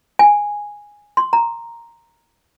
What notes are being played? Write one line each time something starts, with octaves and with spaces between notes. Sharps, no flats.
G#5
C6
A#5